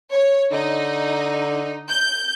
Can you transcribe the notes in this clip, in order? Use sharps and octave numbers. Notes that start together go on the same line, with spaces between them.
C#5
D3 D#4
G6